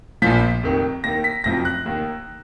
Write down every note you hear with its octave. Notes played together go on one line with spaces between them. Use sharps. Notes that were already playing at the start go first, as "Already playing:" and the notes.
A#1 A#2 F3 B6
F1 F2 D#3
D#2 D#3 A#6
B6
F#1 F2 F3 A#6
F#6
D#2 D#3